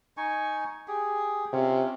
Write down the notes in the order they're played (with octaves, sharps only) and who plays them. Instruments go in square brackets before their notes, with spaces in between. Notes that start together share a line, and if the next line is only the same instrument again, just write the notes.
[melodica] D#4 G#5 C#6
G4 G#4
[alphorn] C3 [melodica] C#4 F4